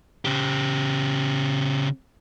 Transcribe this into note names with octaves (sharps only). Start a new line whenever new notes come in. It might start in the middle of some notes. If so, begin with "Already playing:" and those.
C#3 G4